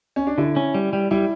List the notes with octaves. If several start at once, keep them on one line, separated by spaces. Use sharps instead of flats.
C#4
D4
D3 E4
C#4
G3
G3
G3 E4